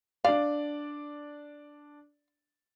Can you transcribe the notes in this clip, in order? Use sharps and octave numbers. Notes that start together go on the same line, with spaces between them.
D4 D5 F5